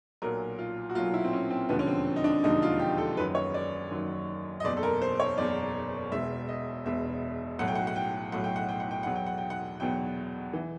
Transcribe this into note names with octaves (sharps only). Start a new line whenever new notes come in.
B1 A#2 F#3 A#4
F4
F#4
B1 A#2 F#3 F4
E4
C4
C#4
C4
E1 D#2 D3 F3 B3
C#4
C4
D#4
D4
E1 D#2 D3 F3 D#4
F4
G4
A4
F#1 F#2 D#3 F#3 B4
C#5
D5
F#1 F#2 D#3 F#3
D#5
F#1 E2 B2 D5
A4
A#4
C5
C#5
F#1 E2 B2 D5
E1 E2 B2 E5
D#5
E1 E2 B2 E5
B1 A2 F#3 F#5
G5
F#5
F#5
G5
B1 A2 F#3 F#5
G5
F#5
G5
F#5
G5
E2 B2 F#3 F#5
G5
F#5
G5
F#5
E2 B2 F#3 G5
E3